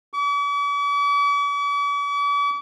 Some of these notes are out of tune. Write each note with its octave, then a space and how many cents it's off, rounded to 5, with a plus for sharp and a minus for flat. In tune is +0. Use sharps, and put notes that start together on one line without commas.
D6 -45